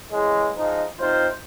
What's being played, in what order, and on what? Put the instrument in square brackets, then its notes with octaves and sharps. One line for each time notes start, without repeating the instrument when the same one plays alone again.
[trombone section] C#3 E3 G#3
F3 G#3 D#4
C3 D#4 F4 C5